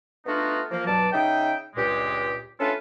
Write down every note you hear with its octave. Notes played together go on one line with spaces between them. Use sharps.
A3 B3 D4 D#4 F4 F#4
F3 A#3
G2 B2 F#3 D5 A5
C#3 D#4 E5 G5
C#2 G2 A#2 G#3 G4
A3 C#4 D4 F4 A4 B4